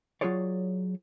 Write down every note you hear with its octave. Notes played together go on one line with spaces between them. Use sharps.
F#3 C#4 F4 G#4 C#5 D5